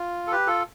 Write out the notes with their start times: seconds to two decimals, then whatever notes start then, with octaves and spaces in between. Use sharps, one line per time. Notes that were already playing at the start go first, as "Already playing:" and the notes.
Already playing: F4
0.27 A4
0.32 G4 B4
0.47 F4 A4